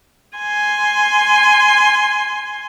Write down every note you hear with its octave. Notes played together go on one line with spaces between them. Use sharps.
G#5 C6